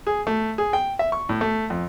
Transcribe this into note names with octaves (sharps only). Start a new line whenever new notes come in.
G#4
A3
G#4
G5
E5
C#6
A2
A3
F2